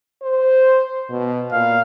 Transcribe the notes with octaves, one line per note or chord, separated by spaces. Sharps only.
C5
B2
A#2 F5